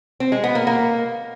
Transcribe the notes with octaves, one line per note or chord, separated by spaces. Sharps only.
C4
G#3
B3
A#3
A#3